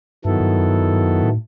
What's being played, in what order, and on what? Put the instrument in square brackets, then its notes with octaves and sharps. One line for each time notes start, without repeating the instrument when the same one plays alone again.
[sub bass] G2 [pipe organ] D#3 F#3 B3 E4 A4
[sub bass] G2
F#2
G2
F#2
G2
F#2
A2